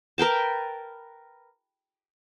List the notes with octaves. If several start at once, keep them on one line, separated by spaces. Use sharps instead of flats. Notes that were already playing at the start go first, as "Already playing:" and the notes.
A#4 B4 G5 A5